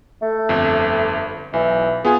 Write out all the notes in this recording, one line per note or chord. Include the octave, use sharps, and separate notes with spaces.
A3
G1 F2
B1 E3
B3 F4 G#4 G#5